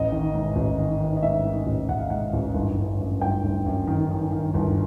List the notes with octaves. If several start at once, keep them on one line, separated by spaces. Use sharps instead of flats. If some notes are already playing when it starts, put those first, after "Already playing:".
Already playing: A1 D#5
D#3
G#2
A1
D#3
D#3
D#5
G#2 E5
D#3
A1
A1 F#5
F5
G#2 F#5
A1
G1
G1
F#2
G1 G5
G1
F#2
D#3
D#3
D#3
G1